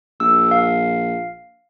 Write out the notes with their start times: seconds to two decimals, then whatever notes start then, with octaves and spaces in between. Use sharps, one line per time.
0.20 A#1 E6
0.51 F5